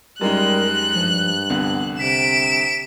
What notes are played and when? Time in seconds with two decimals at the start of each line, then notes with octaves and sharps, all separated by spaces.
0.21 F#2 G3 G#3 D#4 A#4 F#6
0.95 G2 F3
1.50 C2 D3 B3
1.99 C3 B6 D7 E7